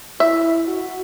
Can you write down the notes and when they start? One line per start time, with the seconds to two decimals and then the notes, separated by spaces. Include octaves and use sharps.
0.20 E4 E5
0.67 F#4